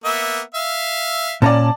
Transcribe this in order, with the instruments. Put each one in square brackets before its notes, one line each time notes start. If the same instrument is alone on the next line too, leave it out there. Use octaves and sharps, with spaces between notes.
[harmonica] A#3 B3 E5
E5 F5
[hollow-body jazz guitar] A#2 C#4 A#5 [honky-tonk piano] D5 A5